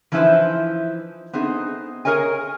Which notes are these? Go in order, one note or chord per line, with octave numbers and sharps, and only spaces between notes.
E3 F3 D#4 E4 B4 C5
B3 C4 D#4 G#4
G#4 A#4 C#5 D#5 G#5